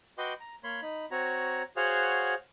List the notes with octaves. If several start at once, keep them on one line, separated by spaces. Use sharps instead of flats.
F#4 B4 D#5 G5 C6 D6
A#5
A#3 C#5 B5 C6
D#4 B5
C4 F#4 C#5 A#5
F#4 G#4 C5 C#5 F5 F#5